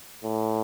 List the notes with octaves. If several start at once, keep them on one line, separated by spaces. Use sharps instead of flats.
A2